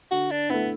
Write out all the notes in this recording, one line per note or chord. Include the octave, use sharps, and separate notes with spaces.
D3 F#4
D4
A3 B3 E4